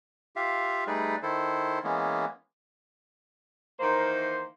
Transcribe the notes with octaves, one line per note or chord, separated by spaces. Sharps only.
F4 G4 E5 F5
G3 A3 D#4 G#4 B4 D5
D#3 E4 A4 C5
E3 G#3 A#3 B3 C#4
D#3 E3 A#3 C5